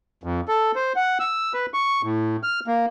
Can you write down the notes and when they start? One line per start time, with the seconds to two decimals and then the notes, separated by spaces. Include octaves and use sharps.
0.24 F2
0.48 A4
0.76 C5
0.96 F#5
1.20 E6
1.54 B4
1.74 C#6
2.03 A2
2.43 F6
2.67 A#3